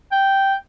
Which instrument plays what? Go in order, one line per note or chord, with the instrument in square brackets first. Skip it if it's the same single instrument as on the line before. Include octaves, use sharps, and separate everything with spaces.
[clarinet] G5